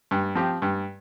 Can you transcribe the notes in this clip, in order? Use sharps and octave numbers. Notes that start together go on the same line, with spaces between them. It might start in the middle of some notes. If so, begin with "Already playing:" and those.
G2
F3 C4 G4
G2